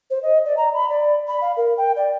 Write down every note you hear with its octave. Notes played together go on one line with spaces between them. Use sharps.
C5
D#5
D5
A#5
B5
D5
B5
F5
A#4
G5
D5